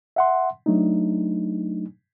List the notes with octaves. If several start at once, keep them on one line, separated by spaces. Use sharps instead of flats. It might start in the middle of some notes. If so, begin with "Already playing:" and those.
E5 F#5 C6
F#3 A3 D4 D#4